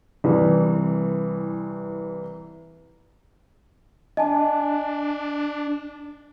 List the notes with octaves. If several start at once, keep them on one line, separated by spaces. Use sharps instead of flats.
C2 E3
D4 D#5 G#5 A5